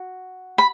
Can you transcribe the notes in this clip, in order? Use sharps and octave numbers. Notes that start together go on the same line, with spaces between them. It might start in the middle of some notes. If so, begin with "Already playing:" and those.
Already playing: F#4
B5